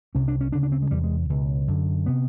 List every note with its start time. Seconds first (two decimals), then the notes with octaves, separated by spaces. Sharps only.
0.15 C2 C3 C#4
0.28 D4
0.41 C#4
0.52 D2 C#3 D4
0.63 D4
0.72 C4
0.82 G#3
0.91 E2 C3 G3
1.04 G#3
1.29 C#2 B2
1.68 F#2 D3
2.06 C3 B3